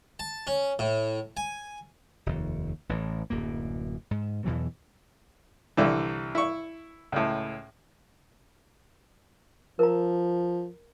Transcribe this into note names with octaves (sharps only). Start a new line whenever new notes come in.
A5
C#4
A2
G#5
F1 D#2
A1 A2 E3
D1 F#2 A#3
G#2
E2 B2 E3 F#3
C2 D3 E3
E4 C#6
C#2 A2
F3 A#4 A#5